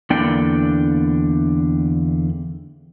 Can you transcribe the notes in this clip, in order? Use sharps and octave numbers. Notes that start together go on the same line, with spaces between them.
E2 D3 A#3 D4 D5 G5